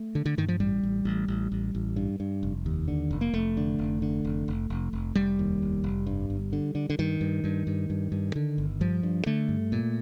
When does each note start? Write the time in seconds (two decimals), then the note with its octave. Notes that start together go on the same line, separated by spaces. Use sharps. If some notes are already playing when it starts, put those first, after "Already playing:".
Already playing: A3
0.15 D3
0.26 D3
0.37 G2 D#3
0.48 F3
0.60 A1 G3
0.83 A1
1.05 A1
1.28 A1
1.52 A1
1.75 A1
1.96 G2
2.20 G2
2.43 F1
2.66 D#2
2.88 D3
3.11 F1
3.21 A#3
3.34 F1 A3
3.57 D3
3.79 F1
4.02 D3
4.25 F1
4.48 F1
4.70 F1
4.93 F1
5.15 F1 G3
5.39 D#2
5.62 F1
5.84 F1
6.07 G2
6.30 G1
6.53 D3
6.75 D3
6.90 D3
6.99 G2 D#3
7.21 G2
7.44 G2
7.67 G2
7.90 G2
8.12 G2
8.36 D3
8.58 G1
8.81 G2 F3
9.03 G2
9.26 D3 A3
9.49 G2
9.72 A#2